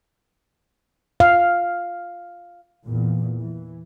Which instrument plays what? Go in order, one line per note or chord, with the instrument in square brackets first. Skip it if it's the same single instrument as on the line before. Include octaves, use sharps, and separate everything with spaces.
[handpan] F5
[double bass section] E2 A#2
E3